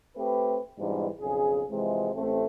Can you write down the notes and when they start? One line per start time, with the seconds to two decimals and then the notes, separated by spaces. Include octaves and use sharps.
0.17 A3 C4 G4 B4
0.79 G#2 B2 E3 F#3 G3 D4
1.21 B1 F2 C#3 G#4
1.71 C3 E3 F3 G#3
2.15 A1 A3 C4